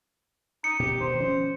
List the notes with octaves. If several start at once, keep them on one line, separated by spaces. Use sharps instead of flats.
D#4 C#7
B2 G4
G2 B2 D#3 C5
F3 C#4